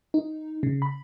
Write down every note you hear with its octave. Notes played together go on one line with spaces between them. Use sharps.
D#4
C#3
B5